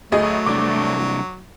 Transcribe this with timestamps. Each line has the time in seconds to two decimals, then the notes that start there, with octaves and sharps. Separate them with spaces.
0.12 D2 F#3 A3 G#4 D#5
0.46 C2 D4 D6